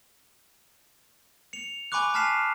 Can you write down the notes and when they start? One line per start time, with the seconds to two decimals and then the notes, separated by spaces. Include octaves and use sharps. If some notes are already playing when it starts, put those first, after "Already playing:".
1.53 C#7 F7
1.92 G#5 B5 C#6 D6 F#6
2.14 G#5 A5 F6 B6 C7 E7